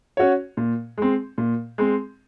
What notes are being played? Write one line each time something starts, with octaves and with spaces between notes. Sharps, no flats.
C#4 F#4 C#5
A#2
G#3 C4
A#2
G#3 C4